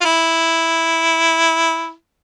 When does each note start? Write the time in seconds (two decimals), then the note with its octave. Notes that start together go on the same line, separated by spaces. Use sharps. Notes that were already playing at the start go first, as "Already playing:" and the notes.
0.01 F4
0.05 E4